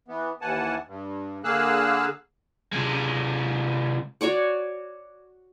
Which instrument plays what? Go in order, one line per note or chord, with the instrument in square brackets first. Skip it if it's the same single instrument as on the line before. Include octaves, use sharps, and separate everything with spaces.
[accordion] E3 B3
D#2 E3 F#5 G#5 A5
G2
D3 A#3 G#4 F5 E6 F#6
[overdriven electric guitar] C3 G#3
[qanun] F#4 C#5 D5 F#5